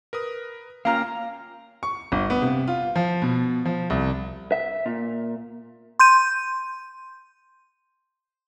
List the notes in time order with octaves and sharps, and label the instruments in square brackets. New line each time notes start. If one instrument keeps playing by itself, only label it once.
[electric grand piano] A#4 B4 D#6
[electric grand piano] A#3 C#4 F4 [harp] G4 A#5 F6 [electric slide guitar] F5
[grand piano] C#6
G1
B3
C3
F4
F3
B2
F3
C2
[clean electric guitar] E5
A#2
[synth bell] C6 G6 D#7